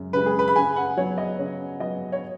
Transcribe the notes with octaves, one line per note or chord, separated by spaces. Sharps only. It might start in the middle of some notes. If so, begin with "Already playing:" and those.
Already playing: F#2 C#3 G#3
C#3 G#3 B4
G#4
B4
B5
C#3 G#5
F#5
F#3 B3 C#5
D#5
C#3 C#5
F#3 B3 D#5
C#5